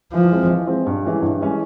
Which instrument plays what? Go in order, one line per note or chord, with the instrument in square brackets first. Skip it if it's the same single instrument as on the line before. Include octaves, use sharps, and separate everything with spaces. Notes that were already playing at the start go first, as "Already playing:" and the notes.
[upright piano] E3 [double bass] F3
[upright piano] G#3 C4
E3
G#3 C4
G2
E3 G#3 C#4
G2
E3 G#3 C#4